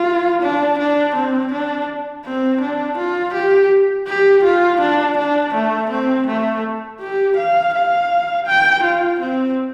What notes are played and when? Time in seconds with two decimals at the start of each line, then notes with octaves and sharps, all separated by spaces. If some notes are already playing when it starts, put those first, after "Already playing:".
Already playing: F4
0.42 D4
0.79 D4
1.16 C4
1.52 D4
2.25 C4
2.62 D4
2.98 F4
3.34 G4
4.08 G4
4.44 F4
4.81 D4
5.18 D4
5.55 A3
5.90 C4
6.27 A3
7.01 G4
7.37 F5
7.74 F5
8.47 G5
8.84 F4
9.20 C4